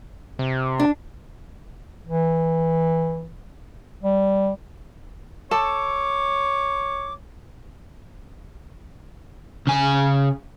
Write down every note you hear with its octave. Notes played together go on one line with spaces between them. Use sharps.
C3
D4
E3
G3
A4 C#5 A5 D6
C#3 G#5